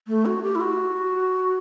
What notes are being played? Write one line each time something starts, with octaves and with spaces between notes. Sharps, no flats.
A3
F#4
G4
E4
F#4